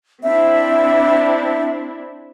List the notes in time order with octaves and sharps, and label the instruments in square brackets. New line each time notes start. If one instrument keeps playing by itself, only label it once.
[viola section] C4 D4 E4 [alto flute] E5